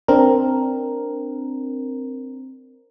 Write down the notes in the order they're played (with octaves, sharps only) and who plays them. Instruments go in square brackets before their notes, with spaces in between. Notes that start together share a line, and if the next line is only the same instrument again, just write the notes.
[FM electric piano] C4 D4 A#4